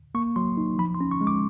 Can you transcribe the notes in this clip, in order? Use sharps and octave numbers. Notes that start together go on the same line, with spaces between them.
A#3 C#6
F#3 C6
D#4
F3 B5
C6
C#4
C#6
G#3
D6